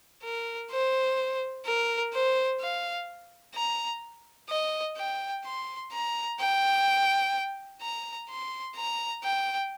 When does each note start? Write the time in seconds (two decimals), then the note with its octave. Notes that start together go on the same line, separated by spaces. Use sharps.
0.23 A#4
0.71 C5
1.66 A#4
2.13 C5
2.60 F5
3.55 A#5
4.49 D#5
4.97 G5
5.45 C6
5.92 A#5
6.39 G5
7.81 A#5
8.29 C6
8.76 A#5
9.23 G5